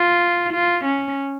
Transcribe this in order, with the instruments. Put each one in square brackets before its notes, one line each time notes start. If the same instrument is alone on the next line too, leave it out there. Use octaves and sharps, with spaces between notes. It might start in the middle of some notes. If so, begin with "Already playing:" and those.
Already playing: [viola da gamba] F4
F4
C#4